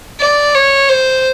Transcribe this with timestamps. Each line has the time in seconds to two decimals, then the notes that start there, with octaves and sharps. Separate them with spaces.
0.20 D5
0.54 C#5
0.89 C5